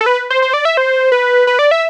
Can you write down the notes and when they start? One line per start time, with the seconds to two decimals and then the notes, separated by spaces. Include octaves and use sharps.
0.01 A4
0.06 B4
0.30 C5
0.42 C5
0.54 D5
0.65 E5
0.77 C5
1.12 B4
1.47 B4
1.59 D5
1.71 E5